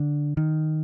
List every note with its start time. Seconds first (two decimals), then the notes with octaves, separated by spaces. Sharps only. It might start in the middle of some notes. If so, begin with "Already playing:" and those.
Already playing: D3
0.37 D#3